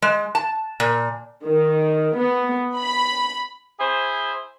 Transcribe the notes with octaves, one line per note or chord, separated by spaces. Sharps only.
G#3
A5
A#2
D#3
B3
B5
E4 G#4 C5